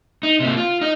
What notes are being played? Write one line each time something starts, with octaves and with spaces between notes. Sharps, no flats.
D#4
C3 A#3
F4
D#4 D#5